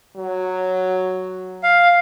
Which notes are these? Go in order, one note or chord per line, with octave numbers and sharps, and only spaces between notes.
F#3
F5